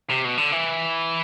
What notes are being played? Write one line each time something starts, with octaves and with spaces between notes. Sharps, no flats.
C3
B2
D3
E3